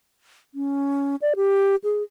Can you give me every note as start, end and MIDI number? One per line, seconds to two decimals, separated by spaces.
0.55 1.16 61
1.22 1.34 74
1.36 1.76 67
1.84 2.03 68